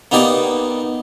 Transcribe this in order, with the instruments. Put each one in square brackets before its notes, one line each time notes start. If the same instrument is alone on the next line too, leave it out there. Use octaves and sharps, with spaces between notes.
[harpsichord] A#3 B3 D#4 G4 D5